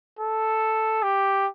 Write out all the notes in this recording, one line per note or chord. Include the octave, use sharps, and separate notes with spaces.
A4
G4